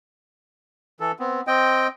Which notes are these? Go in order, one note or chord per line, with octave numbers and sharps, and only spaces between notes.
E3 A4
B3 C4
C4 D#5 G5